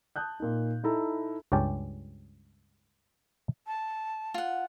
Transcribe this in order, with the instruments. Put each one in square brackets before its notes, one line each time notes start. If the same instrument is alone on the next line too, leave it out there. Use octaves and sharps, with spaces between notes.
[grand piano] A5 D#6 F#6 G6
A#2 D#4
D#4 E4 A4 A#5
[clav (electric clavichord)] C#2 G2 C#4 G4 G5 A5
[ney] A5
[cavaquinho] F4 F#5